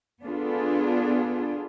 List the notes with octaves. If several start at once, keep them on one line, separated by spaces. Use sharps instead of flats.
B3 D4 F4 G#4 A4